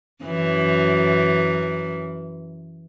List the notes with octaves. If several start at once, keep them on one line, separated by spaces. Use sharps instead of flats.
F#2 E3